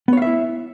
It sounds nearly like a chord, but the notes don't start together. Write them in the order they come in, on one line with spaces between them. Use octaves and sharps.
B3 C#5 F5 E5 E4